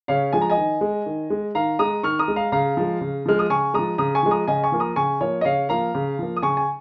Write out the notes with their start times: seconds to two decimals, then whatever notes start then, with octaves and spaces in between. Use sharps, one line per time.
0.08 C#3 C#5 F5
0.33 F3 G#3 G#5
0.41 A#5
0.50 D#5 G#5
0.57 D#3
0.81 G#3
1.06 D#3
1.30 G#3
1.55 D#3 F5 A#5
1.79 G#3 A#5 D#6
2.03 D#3 C#6 F6
2.19 A#5 D#6
2.28 G#3
2.36 F5 A#5
2.52 C#3 F5 A#5
2.77 F3 G#3
3.01 C#3
3.26 F3 G#3 F6
3.39 D#6
3.50 C#3 G#5 C#6
3.74 F3 G#3 A#5 D#6
3.98 C#3 A#5 D#6
4.15 G#5 C#6
4.23 F3 G#3
4.31 A#5 D#6
4.48 C#3 D#5 G#5
4.64 G#5 C#6
4.72 F3 A#3
4.80 A#5 D#6
4.96 C#3 G#5 C#6
5.21 F3 A#3 C#5
5.41 D#5
5.45 C#3 C#5 F5
5.69 F3 A#3 F5 A#5
5.94 C#3
6.19 F3 A#3
6.37 D#6
6.42 C#3 G#5 C#6
6.57 G#5